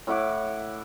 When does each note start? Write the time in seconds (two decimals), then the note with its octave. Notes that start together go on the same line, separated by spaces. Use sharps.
0.07 A2 E4 F#5 D6